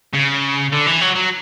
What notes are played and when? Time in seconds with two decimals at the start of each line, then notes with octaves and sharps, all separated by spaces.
0.14 C#3
0.73 D3
0.87 E3
1.01 F#3
1.16 F#3